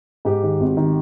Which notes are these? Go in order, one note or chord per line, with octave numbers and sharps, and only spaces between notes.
G#2 G4
D#3
G#1
D#3